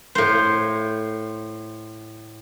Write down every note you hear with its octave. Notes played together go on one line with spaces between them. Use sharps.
A2 C5